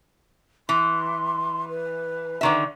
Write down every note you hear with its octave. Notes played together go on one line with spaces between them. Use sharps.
E3 C6
B4
D3 D#3 E5